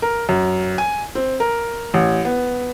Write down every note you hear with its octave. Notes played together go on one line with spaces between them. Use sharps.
A#4
F#2
G#5
C4
A#4
A1
B3